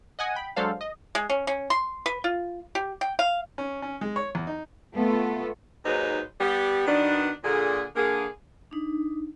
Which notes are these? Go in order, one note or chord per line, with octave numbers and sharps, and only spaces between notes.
D#5 F#5 G#5 D#6
G5 B5
F#3 G#3 D4 A4 C5 F5
D#5
G#3
C#4
C#4
C6
B4
F4
G4
G5
F5
C#4
C#4
G#3
C#5
E2
D#4
A3 B3 F4 A4
D#2 G#2 F#3 D#4 B4 C5
G3 B3 G4
B2 D#3 B3 D4
A#2 D3 G#4
D3 A#3 G#4
D4 D#4